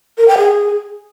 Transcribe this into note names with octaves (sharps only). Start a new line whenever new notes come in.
A#4
G5
G#4